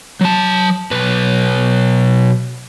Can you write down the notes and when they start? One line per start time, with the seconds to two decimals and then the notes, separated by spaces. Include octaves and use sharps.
0.21 F#3 A5
0.91 B1 B4